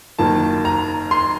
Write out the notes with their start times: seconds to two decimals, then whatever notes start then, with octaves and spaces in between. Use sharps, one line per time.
0.19 F#1 F#2 D#3 A#3 A5
0.65 A#5
1.11 C6